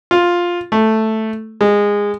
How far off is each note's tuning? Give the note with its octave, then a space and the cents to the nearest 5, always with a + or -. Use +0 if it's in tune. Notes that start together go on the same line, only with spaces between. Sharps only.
F4 +5
A3 +0
G#3 -20